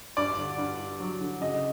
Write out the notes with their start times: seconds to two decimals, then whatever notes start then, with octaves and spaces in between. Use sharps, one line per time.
0.17 G2 D5
0.38 D3
0.58 G2
0.80 G2
1.00 F#3
1.20 D3
1.41 C#3 D#5